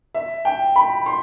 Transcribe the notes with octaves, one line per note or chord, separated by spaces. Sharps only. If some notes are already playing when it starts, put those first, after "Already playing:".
E5
G5
B5
C6